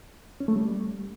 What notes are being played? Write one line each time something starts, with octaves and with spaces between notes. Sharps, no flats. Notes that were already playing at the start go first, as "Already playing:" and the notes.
C#4
A3
G3